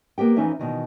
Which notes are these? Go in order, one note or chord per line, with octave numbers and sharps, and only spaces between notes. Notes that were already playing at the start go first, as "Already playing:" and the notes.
A#3 B3 G4 G5
F2 E3 C#4 D#4 C#5 E5
B2 D#3 E3